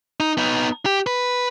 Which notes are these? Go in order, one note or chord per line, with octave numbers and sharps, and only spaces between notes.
D#4
B3 D#4
G4
B4